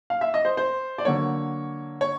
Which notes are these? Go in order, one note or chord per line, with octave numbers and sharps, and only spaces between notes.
F5
E5
D#5
C5
C5
D5
D3 F#3 A#3 C#5
C#5